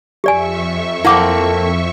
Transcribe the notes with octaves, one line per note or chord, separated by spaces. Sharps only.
F2 G4 D5 E5 G#5 C#6
A#3 C4 E4 A4 F#5 D6